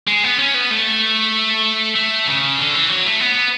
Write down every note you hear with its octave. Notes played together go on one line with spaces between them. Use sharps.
G#3
B3
C#4
B3
A3
A3
C#3
D3
E3
F#3
A3
B3